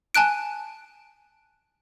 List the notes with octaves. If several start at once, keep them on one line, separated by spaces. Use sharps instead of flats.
G#5 A5 F#6 D7